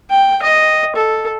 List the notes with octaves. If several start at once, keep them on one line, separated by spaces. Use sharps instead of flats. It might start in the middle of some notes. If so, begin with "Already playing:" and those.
G5
D#5
A4